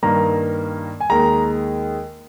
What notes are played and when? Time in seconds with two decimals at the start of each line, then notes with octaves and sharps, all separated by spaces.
0.03 G2 D#3 A#3 A#5
1.00 G#5
1.10 D#2 D#3 G#3 A#5